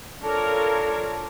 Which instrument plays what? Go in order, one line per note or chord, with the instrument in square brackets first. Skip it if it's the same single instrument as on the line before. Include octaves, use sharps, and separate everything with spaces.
[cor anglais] D4 [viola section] F4 A#4 C#5 [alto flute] A4